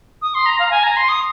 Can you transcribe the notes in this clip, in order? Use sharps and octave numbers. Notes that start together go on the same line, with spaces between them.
D#6
C6
A#5
F5
A#5
G#5
A#5
C6
D#6